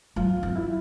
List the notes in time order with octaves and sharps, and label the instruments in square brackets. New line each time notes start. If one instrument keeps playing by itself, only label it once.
[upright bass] F#3 [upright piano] F4
[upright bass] C4
[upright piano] E4